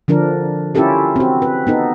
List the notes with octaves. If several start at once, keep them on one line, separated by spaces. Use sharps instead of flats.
D3 F3 D4 A#4
C#4 E4 F4 G4 A4 A#4
C4 F#4
B4
B3 D#4 A4